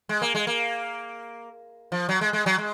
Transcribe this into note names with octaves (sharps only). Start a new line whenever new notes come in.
G#3
A#3
G#3
A#3
F3
F#3
G#3
G#3
F#3
G#3